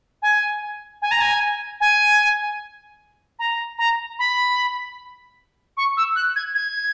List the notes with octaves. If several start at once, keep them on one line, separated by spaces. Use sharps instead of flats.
G#5
G#5
A#5
G#5
G#5
A#5
A#5
B5
C#6
E6
F#6
G#6
G#6